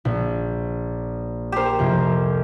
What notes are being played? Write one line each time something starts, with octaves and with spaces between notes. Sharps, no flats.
A#1
G4 A#4 C5 E7
C2 F2